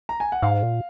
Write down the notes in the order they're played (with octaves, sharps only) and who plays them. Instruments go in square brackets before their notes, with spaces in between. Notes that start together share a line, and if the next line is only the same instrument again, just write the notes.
[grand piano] A#5
G#5
F#5
[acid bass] G#2 [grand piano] F5
[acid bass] A#2